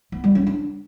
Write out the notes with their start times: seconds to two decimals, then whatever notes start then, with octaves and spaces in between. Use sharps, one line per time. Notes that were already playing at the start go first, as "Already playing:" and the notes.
0.12 B3
0.24 G3
0.35 C#4
0.47 D4